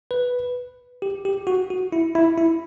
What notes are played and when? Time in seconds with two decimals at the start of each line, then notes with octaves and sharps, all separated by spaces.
0.11 B4
1.02 G4
1.25 G4
1.47 F#4
1.70 F#4
1.92 E4
2.15 E4
2.38 E4